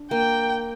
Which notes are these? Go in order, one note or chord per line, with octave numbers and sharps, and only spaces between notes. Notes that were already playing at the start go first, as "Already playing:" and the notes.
Already playing: D4
A#3 G5